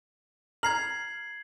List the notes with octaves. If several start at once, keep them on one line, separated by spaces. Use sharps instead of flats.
A#5 F6 G#6 C7 F#7